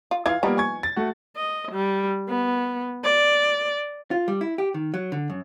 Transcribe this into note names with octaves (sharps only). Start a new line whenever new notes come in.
F4
E3 F4 F5 G#6
F3 G3 A#3 B3 D#4
G#5 C#6 G#6
A6
A3 F#4
D#5
G3
B3
D5
F4
G3
E4
G4
D#3
F#3
D3
F#2